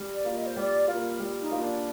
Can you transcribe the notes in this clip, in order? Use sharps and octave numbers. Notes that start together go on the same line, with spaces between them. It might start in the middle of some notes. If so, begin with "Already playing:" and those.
Already playing: G3
D5
A#3 F4
D#5
C5
G3 D5
A#3 F4 A#4
G3
D#4
A#3 F4
D4